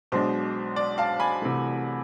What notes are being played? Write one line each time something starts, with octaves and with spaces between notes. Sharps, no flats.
B1 B2 G#3 D4 C5
D5
F5 A5
G#5 B5
C2 C3 E3 A3